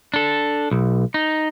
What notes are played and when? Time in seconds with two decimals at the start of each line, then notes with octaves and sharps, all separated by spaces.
0.14 D4 A4
0.71 B1
1.14 D#4